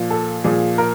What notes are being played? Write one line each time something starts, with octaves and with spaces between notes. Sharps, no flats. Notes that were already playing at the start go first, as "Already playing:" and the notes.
Already playing: A#2 F3
A4
A#2 F3 G#4
A#4